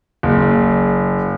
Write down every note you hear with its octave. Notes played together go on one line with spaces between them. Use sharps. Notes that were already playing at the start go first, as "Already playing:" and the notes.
F#1